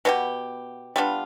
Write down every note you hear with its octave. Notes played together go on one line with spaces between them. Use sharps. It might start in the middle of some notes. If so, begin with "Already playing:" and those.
B2 B3 D4 G4
G3 B3 D4 F4